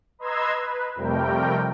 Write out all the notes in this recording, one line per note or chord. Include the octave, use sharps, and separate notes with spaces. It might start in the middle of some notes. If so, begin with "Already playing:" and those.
B4 D#5 A#5 C6 E6 G#6
B4
F2 C3 G3 A3 A#4 G5